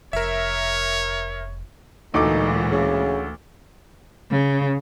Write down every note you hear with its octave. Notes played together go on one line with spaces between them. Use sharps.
F1 A#4 C#5 E5
D2 A#2 E3 G#3 D#4 A4 D6
C#3
C#3